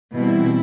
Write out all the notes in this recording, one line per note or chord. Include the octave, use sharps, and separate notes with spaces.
B2 E3 G3 C4 E4